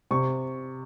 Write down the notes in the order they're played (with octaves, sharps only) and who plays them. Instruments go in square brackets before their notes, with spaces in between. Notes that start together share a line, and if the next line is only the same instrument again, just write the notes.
[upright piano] C3 C#6